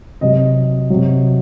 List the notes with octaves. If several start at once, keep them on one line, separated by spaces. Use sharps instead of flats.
C3 F#3 D#5
C3 F#3